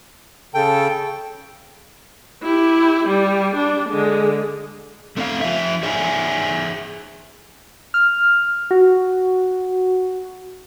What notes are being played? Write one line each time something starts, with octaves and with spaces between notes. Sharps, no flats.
C#3 A4 G5
E4 G4
G3
D4
D3 G#3
A3 C4 C#5 F5
F3 E5
G#4 C#5 E5 F#5 G#5
F6
F#4